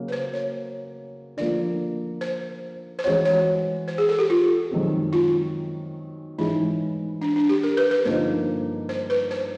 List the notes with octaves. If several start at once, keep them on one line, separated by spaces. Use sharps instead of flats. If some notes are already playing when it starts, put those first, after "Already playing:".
Already playing: C#3 F#3 A#3 C#4 F#4
B4
C5
C#5
D3 F3 A#3 D5
C5
C5
E3 G#3 C#4 F#4 C#5
C#5
C5
G#4
A4
G4
F4
F#2 D#3 G#3 C4
F4
G#2 E3 G#3 C#4 D#4 E4
D4
D4
G4
A#4
B4
B4
G2 D3 F3 A#3 D#4 C5
C5
B4
C5